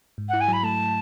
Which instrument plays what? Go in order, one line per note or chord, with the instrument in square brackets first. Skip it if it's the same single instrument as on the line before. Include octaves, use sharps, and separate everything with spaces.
[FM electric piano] G#2
[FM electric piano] E4 [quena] F#5
[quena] G#5
[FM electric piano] F#3 [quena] B5
[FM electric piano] A3 [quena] A5